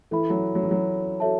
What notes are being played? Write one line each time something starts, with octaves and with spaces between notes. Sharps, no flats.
E3 A4 E5 B5
F#3
F#3
E3
F#3
F#4 A4 C#5 E5 A5